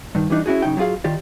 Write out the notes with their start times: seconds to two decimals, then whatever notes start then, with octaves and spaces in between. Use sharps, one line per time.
0.15 G2 D#3
0.30 E3 G3 D4 D#4
0.46 C#4 E4 F#4 G#4
0.62 F#2 C#3 D#4 G5
0.77 F#3 D#4 F4 G#4 F5
1.04 D#3 F4 G4 D5